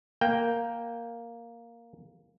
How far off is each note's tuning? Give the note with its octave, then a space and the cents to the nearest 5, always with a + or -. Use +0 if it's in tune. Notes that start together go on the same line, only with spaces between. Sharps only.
A#3 +0 G5 +0